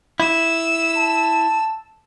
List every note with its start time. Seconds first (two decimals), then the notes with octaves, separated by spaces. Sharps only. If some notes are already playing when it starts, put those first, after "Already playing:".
0.20 E4 E6
0.98 A5